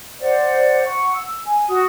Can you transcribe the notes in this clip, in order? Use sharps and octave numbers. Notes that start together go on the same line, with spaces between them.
C5 D5 F#5
F#5 C#6
E6
G#5
F#4 D#6